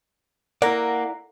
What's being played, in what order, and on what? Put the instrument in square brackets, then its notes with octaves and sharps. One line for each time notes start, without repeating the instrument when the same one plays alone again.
[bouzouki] A#3 [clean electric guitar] E4 D5 [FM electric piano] F#5 A#5